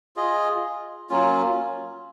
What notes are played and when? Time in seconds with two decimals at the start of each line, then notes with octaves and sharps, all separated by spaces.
0.16 F4 G#4 D#5
1.09 F#3 A#3 C#4 F4